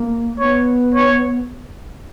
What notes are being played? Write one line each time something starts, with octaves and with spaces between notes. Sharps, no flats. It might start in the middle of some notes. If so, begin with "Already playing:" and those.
Already playing: A#3
B3 C#5
C#5